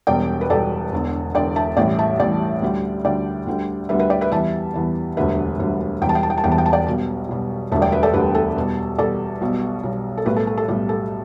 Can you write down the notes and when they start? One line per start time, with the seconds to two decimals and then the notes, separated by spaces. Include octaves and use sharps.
0.07 E1 E2 B2 G3 D5 G5
0.41 B4
0.50 E1 E2 B2 G3 A4 D5
0.93 E1 E2 D3
1.34 E1 E2 D3 D5 G5
1.56 E5 A5
1.77 A1 A2 E3 G3 D5 G5
1.99 E5 A5
2.19 A1 A2 E3 G3 D5 G5
2.62 D2 D3 G3
3.05 D2 D3 G3 D5 G5
3.47 D2 D3 G3
3.89 D2 D3 G3 B4 E5
3.99 B4 E5
4.10 D5 G5
4.21 B4 E5
4.32 E2 E3 G3 E5 A5
4.74 E2 E3 G3
5.17 E1 D2 D3 G3 B4 E5
5.59 E1 D2 D3 G3
6.02 E1 E2 E3 G3 G5
6.09 A5
6.15 G5
6.23 A5
6.30 G5
6.38 A5
6.44 E1 E2 E3 G3 G5
6.52 A5
6.58 G5
6.66 A5
6.73 D5 G5
6.87 B1 B2 G3
7.29 B1 B2 G3
7.71 E1 D2 D3 G3 E5 A5
7.82 D5 G5
7.92 B4 E5
8.03 A4 D5
8.14 E1 D2 D3 G3 G4 B4
8.35 A4
8.56 E2 B2 G3
8.98 E2 B2 G3 A4 D5
9.41 B1 B2 G3
9.83 B1 B2 G3
10.18 A4
10.26 B1 A2 G3 G4 B4
10.36 A4
10.47 A4
10.58 A4
10.68 B1 A2 G3 G4
10.89 A4